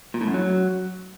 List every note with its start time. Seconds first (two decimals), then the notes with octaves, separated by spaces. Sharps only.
0.14 A#2
0.21 A2
0.27 F#2
0.34 F#3